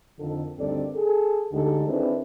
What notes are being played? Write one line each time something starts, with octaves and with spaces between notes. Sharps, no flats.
F2 D3 D#3 F3 A4
D2 G2 D#3 C4 A4 D5
G#4 A4
D2 D3 G#3 D#4 G4 A4
D#3 C4 D4 E4 G#4 B4